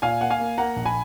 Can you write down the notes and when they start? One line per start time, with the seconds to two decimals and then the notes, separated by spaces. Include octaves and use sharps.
0.02 A#2 F5 G#5
0.21 A#3 F#5
0.30 F5 G#5
0.40 A#3
0.58 A#3 F#5 A#5
0.76 A#1
0.85 G#5 B5